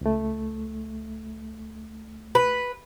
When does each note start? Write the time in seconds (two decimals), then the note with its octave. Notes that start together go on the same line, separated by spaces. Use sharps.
0.01 C#2 A3
2.35 B4